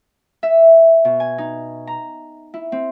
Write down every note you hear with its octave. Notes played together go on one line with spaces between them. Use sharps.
E5
B2
G#5
D#4
A#5
E4
C4